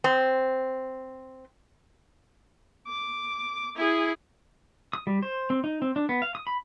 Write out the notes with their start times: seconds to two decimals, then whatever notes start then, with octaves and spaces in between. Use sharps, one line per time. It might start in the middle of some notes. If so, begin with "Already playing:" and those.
0.04 C4
2.87 D6
3.76 E4 G#4
4.93 D#6
5.07 G3
5.23 C5
5.50 C4
5.64 D#4
5.82 C4
5.96 D4
6.09 B3
6.22 F5
6.35 D#6
6.47 B5